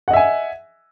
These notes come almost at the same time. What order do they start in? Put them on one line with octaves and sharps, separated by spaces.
F#5 D#5 E5 G#5